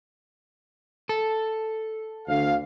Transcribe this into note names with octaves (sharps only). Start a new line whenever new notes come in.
A4
D2 F5